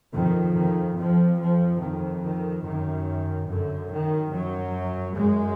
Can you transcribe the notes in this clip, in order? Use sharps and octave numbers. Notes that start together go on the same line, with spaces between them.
F2 D#3
D#3
F2 F3
F3
F2 D#3
D#3
F#2 D#3
F#2 D3
D#3
F#2 F#3
F#2 G#3